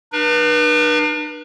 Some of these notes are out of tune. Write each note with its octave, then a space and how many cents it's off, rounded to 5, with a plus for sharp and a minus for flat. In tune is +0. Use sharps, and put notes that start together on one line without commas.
D4 +45 B4 -40